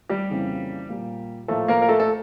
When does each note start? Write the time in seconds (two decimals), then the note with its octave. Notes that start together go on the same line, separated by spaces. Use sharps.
0.09 G3 G4
0.30 F2 C#3 E3 A#3
0.89 A#2 G3 A#3
1.48 A2 F3 A3 A#3 A4
1.68 A#3 A#4
1.82 A#4
1.88 A3 A4
2.00 A4